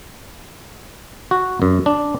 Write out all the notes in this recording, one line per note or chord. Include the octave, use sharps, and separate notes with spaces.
F#4
F#2
D4